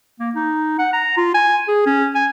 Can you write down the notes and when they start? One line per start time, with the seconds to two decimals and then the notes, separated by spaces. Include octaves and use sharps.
0.19 A#3
0.35 D#4
0.79 F#5
0.93 A#5
1.17 F4
1.34 G#5
1.68 G#4
1.86 C#4
2.15 G#5